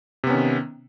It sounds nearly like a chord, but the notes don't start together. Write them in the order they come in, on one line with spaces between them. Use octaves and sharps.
C3 B3 C#4 D#3